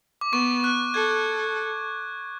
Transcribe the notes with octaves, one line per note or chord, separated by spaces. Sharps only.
D6
B3 C#6
F#6
A4 G#6